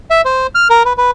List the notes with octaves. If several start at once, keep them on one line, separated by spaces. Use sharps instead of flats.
E5
C5
F6
A#4
B4
B4